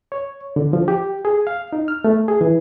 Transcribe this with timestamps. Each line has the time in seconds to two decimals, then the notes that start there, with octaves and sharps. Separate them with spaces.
0.12 C#5
0.56 D3
0.73 F3
0.88 G4
1.25 G#4
1.47 F5
1.73 D#4
1.88 F6
2.04 A3
2.28 G#4
2.41 E3